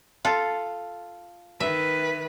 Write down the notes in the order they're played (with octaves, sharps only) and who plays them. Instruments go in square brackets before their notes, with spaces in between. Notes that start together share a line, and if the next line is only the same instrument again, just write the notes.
[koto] F4 A4
[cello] D#3 B4 [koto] E5